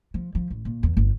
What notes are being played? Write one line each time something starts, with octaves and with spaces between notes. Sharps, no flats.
F3
F3
A1
A#2
E2
G1